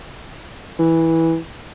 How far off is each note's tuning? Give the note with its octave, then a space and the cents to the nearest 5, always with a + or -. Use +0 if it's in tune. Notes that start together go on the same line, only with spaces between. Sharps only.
E3 -10